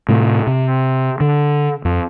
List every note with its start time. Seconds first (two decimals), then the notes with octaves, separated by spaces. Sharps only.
0.09 A2 C3 A3
0.47 C3
1.20 D3
1.85 F2